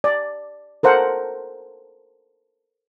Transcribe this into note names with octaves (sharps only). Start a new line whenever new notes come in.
D5
A4 A#4 C5 F#5